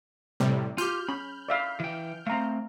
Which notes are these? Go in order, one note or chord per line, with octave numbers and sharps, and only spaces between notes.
A2 C3 G3
F4 G4 F6 G6
C#4 B5
D5 E5 F5
E3 G5
A3 C4 F5 A#5